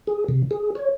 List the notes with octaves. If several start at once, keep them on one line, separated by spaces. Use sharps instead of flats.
G#4
C3
G#4
C#5